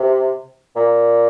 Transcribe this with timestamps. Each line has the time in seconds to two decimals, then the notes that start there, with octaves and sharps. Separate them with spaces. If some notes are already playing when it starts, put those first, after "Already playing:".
Already playing: C3
0.76 A#2